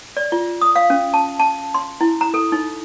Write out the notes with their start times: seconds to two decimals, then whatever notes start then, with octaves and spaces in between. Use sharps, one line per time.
0.17 D5
0.32 F4
0.62 D#6
0.76 F5
0.90 C#4
1.14 A5
1.39 A5
1.74 C6
2.01 E4
2.21 A#5
2.34 A4
2.52 D#4